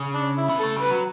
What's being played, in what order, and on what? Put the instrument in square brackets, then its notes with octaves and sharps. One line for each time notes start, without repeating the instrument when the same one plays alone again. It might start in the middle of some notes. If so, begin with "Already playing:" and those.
Already playing: [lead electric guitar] C#3
[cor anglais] D4
E4
[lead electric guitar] B3
[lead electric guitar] A3 [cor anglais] A4
[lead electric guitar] G3 [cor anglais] B4
[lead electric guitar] F#3